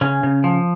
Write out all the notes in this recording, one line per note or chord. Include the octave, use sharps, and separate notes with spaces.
C#3 C#4
C#3
F3